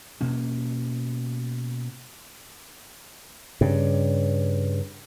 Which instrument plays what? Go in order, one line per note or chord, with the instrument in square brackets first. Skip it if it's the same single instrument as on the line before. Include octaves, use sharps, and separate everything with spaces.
[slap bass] B2 A#3 C#4
G2 C#3